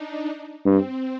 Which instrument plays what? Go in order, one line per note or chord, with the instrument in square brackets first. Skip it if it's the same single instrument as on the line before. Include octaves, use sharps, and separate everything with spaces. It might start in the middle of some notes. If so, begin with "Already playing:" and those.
Already playing: [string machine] D4 D#4
[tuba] G2 [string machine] C4